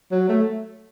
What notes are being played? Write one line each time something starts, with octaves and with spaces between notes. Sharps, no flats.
F#3
A3